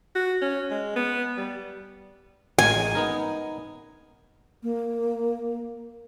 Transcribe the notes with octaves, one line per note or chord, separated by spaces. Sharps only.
F#4
C#4
G#3
B3
G3
A1 G#3 A#4 G#5
B3 D#4 A#4
A#3